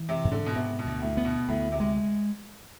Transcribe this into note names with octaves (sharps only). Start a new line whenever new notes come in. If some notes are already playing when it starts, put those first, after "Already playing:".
Already playing: E3
C3
G#2
D3
B2
C3 B3
B2
D2
A2
B3
B2
D2 A2
C3
G#3